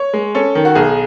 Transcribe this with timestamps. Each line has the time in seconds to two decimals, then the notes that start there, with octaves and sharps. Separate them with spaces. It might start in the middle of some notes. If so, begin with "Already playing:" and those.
Already playing: C#5
0.13 G#3
0.35 C#4 A4
0.55 D#3
0.65 F#4
0.75 B1 G#4